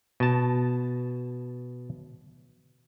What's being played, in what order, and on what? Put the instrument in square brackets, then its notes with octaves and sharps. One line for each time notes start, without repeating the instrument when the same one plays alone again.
[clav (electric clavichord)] B2 A5